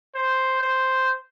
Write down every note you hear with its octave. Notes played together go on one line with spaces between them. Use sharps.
C5
C5